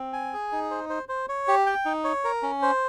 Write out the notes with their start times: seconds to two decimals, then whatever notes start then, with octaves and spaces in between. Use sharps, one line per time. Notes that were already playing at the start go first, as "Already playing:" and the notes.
Already playing: C4
0.13 G#5
0.33 G#4
0.52 D#4
0.71 C5
0.89 C5
1.09 C5
1.29 C#5
1.48 G4
1.66 G5
1.85 D#4
2.04 C#5
2.24 A#4
2.43 C#4
2.62 C5